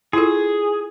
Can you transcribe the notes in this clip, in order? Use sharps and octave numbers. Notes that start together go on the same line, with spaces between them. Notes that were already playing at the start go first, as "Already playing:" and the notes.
E4 F4 G#4 A4